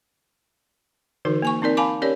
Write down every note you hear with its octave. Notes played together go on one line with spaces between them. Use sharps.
D3 E3 D#4 F#4 A#4
A#3 G#5 C#6
C4 D#4 A#4 D5
F5 G#5 A5 B5 D6
C#4 G4 A#4 C#5 D5